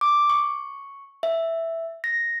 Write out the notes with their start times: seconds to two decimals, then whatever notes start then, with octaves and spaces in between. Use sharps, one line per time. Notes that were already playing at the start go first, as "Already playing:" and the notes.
0.01 D6
0.30 C#6
1.23 E5
2.04 A#6